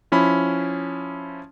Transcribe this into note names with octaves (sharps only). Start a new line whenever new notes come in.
F3 C#4 E4 B5